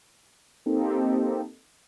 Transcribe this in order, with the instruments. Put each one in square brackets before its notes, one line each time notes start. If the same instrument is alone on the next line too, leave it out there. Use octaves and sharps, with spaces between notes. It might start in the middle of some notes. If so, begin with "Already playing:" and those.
[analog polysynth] A#3 C4 D#4 G4 A4